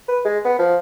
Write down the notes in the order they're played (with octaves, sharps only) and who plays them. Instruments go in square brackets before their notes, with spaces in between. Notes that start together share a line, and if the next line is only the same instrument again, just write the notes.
[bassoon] B4
G#3
B3
F3